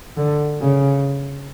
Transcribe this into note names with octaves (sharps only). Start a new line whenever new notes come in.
D3
C#3